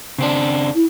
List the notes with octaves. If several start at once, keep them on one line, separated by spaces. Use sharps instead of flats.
C#3 C4 D4
E4